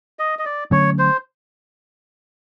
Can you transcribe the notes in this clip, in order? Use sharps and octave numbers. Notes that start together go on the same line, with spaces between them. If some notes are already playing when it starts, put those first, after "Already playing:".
D#5
D#5
D5
D3 F#3 A3 C#4 C#5
C5